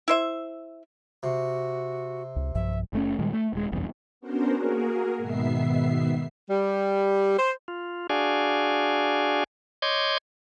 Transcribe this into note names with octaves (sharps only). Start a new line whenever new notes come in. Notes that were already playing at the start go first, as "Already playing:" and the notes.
E4 C5 E5
C3 F#4
C#2
B1 G2 F3 E5
F#1 A3 C#4
A#2 D#3 G3 G#3
A3
D#1 G#3
F1 B1 E2 G2
B3 C#4 D4 F#4 A#4 C5
A#3 F#4 G#4 A#4
G#2 B2 D#3 B3 E5 C7
G3
C5
F4
D4 F#4 G#4 D5 F5 G#5
C#5 D#5 C6 D6 G6 G#6